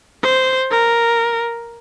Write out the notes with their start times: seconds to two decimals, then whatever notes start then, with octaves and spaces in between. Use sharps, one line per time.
0.22 C5
0.70 A#4